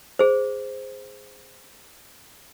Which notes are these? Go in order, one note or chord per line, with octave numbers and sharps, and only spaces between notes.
G#4 C5